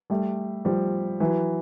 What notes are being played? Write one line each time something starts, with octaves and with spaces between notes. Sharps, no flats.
G3 A3
F3 G3
E3 F#3